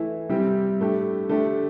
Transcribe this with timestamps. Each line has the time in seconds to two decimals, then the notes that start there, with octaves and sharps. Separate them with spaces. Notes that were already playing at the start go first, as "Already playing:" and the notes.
Already playing: E3 A3 E4
0.29 C3 G3 C4 E4 G4
0.79 A2 A3 D4 G4
1.29 D3 A3 D4 G4